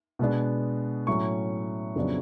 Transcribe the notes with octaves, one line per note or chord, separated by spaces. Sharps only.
B2 G#3 B3 D4
A2 F#3 C#4 C#6
F2 C#3 F#3 B3 D4